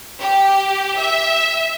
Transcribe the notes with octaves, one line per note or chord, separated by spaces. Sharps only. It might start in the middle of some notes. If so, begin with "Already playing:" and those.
G4
E5